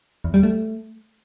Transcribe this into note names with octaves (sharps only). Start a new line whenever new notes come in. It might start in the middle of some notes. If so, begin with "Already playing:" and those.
E2
G3
A3